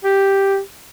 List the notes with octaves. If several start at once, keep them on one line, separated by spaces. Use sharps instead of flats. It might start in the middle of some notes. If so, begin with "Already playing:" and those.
G4